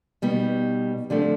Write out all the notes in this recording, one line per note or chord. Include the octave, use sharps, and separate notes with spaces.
B2 G3 B3 D#4
D3 F3 A3 C4